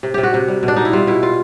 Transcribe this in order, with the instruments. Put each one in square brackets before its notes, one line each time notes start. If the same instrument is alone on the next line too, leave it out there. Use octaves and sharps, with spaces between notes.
[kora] C3
C3 G4
F#4
C3
G3
B2
D4
B2 D#4
E4
G3 F4
B2 E4
F4